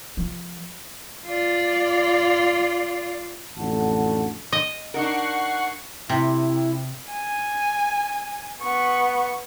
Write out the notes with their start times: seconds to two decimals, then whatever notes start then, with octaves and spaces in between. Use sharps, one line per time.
0.17 F3
1.26 F4 D5
3.57 A1 F2 D3 F#4 A5
4.53 D#5
4.94 D4 D#4 A#4 F#5 C#6 C7
6.09 C3 E4
7.12 G#5
8.62 B3 C#6